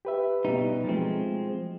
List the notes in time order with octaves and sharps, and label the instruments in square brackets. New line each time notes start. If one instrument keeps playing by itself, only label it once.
[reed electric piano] G4 B4 E5
[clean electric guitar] B2 G3 D#4
[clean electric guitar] F3 G#3 C4 [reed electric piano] F#3 A3